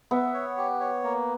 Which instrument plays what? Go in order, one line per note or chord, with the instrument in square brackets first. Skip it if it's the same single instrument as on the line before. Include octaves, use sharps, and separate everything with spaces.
[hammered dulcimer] B3 [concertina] E5
[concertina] C#5
G4
C#5
A#3